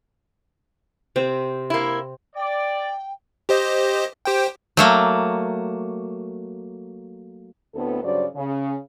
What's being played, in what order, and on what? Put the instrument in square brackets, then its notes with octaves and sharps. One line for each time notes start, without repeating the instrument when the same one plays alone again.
[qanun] C3 C4
[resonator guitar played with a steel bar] A#3 E4
[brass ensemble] D5 [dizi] G5
[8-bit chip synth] G4 C5 D#5
G4 C5 G5
[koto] F#3 A3 A#3
[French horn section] D2 A2 B3 C4 A4
G2 C#3 F#3 C5 D5
C#3